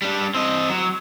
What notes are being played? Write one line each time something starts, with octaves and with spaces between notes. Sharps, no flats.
G3 D4
C4 D#5
F#3